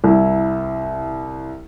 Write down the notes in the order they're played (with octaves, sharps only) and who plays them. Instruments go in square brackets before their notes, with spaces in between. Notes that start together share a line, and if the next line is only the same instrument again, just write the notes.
[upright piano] C2 E4